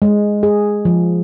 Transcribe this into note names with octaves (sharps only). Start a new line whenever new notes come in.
G#3
G#4
F3